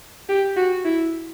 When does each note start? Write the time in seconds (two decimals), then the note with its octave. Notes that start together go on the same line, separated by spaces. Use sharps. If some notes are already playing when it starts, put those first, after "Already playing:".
0.29 G4
0.57 F#4
0.85 E4